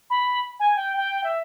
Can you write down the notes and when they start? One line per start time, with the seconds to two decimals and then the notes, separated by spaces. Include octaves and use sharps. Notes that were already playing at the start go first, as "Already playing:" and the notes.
0.10 B5
0.60 G#5
0.76 G5
0.97 G5
1.24 E5